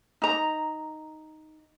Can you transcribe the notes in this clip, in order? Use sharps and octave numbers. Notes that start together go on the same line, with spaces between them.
D#4 A#5